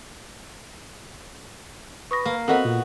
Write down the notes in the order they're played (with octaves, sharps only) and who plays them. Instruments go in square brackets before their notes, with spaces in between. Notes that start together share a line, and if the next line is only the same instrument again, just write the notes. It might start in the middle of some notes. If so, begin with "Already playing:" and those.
[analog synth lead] B4 [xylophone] C#6 D#6 A#6
[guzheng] A#3 A#4
[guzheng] B3 F#4 B5 [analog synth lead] C4 [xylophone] A4 A#4 D#5
[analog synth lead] A#2